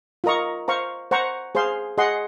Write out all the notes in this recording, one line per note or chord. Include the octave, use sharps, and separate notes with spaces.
F4 A#4 D#5 A#5 C#6
C5 F5 A#5 C#6
C5 F#5 A#5 C#6
G#4 C5 F5 C6
G#4 D#5 F#5 C6